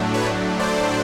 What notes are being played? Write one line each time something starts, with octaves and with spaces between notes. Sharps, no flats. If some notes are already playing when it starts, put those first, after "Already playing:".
Already playing: A2 F#3 A3 D4
B4 C#5
C5 D5